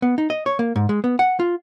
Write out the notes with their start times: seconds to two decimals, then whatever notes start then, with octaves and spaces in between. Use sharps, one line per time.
0.02 B3
0.18 D#4
0.30 D#5
0.46 C#5
0.59 A#3
0.76 G#2
0.89 G#3
1.04 B3
1.19 F#5
1.40 F4